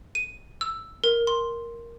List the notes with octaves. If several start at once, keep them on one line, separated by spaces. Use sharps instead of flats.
D#7
E6
A#4
C6